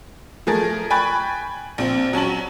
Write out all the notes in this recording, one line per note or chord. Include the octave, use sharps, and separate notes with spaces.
F3 A3 G#4 A#4 A6
G5 G#5 B5 C#6 F#6 A6
A#1 C4
F#3 C#4 A5 F#7